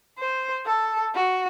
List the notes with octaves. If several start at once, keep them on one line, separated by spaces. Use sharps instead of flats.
C5
A4
F#4